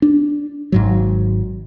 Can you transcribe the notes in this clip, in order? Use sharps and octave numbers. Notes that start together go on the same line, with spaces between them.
D4
G#1 G#2 F#3